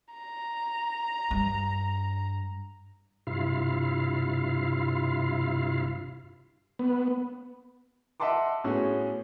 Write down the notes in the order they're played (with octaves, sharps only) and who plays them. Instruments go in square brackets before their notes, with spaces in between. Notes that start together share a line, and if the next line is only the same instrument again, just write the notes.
[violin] A#5
[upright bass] G2
[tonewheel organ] G2 C3 E4 F4 F5
[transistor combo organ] B3
[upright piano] D#5 E5 F#5 A5 C6 D6
A2 A3 B3 C#4 F#4 G#4